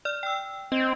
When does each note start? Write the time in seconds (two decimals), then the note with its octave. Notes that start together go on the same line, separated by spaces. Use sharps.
0.05 D5 F6
0.23 G5 E6
0.72 C4 D#5